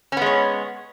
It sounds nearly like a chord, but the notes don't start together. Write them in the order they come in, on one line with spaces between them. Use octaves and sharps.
C#4 B3 G#3 C#5